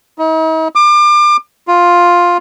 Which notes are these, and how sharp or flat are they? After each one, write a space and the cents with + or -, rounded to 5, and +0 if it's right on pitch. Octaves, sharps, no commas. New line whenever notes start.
D#4 +45
D6 +30
F4 +5